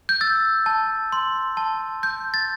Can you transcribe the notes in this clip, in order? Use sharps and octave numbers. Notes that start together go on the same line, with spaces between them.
G6
E6 A6
A5
C6
A5
G6
A6